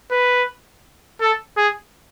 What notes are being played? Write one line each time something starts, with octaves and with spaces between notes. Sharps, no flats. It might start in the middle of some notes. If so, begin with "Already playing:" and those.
B4
A4
G#4